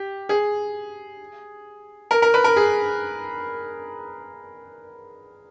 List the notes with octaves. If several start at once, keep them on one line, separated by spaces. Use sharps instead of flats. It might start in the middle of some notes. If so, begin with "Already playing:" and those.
Already playing: G4
G#4
A#4
A#4
B4
A#4
G#4